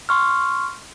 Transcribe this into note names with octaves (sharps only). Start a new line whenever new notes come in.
C6 C#6 F6